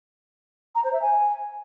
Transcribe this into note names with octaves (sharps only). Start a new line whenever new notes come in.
A#5
C5
E5
G#5